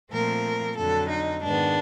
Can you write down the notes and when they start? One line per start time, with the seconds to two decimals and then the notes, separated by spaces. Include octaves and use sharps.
0.11 A#2 F3 A3 C4 A#4
0.76 F2 D3 F#3 A4
1.09 D#4
1.42 G#2 D#3 G#3 B3 D4